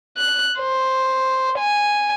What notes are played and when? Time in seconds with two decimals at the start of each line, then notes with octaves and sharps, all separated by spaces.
0.18 F#6
0.59 C5
1.59 G#5